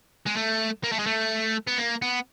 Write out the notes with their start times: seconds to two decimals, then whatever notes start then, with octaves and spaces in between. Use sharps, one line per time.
0.26 G#3
0.37 A3
0.84 A#3
0.92 A3
0.99 G#3
1.06 A3
1.67 B3
1.78 A#3
2.02 B3